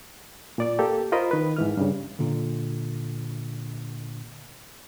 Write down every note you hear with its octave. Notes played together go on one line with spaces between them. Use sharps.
A#2 D5 D6
A#3 G4 A4
F4 A#4 C5 D#5 B5
D#3 B4
G#2 E3 F6
G2 C#3
A#2 D3